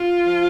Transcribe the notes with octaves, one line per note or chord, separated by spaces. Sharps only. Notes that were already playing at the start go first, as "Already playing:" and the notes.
Already playing: F4
F3